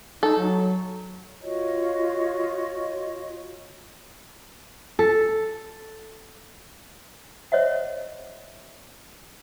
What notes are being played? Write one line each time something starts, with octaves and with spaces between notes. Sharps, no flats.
D#4 A4
F#3
F4 F#4 C#5 D#5
A4
C5 C#5 D#5 E5 F#5